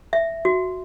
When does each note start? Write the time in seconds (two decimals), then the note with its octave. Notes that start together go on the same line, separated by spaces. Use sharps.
0.13 E5
0.45 F#4